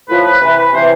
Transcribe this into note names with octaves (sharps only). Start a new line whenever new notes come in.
A2 F3 B4
B4
C3 E3 B4
B4
C3 E3 C5